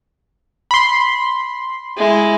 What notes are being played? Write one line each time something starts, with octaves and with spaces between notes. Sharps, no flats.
B5 C6
G#3 E4